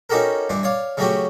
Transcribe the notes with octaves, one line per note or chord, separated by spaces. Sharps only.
C#4 D#4 F#4 G4 A4 A#4
G2 E3 D4
C#5 D5 F5
C#3 F#3 A3 C#4 F#4 G4